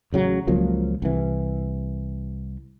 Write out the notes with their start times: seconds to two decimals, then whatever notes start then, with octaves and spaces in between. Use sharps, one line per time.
0.12 A1 C#3 F#3
0.47 C#2 F3 F#3 A#3
1.02 C2 E3